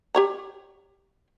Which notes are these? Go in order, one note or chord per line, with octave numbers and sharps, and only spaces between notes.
G4 C#5 A#5